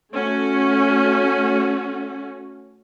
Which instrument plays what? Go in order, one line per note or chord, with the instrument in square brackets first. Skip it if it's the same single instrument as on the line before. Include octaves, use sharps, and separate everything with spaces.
[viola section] A3 C#4 F#4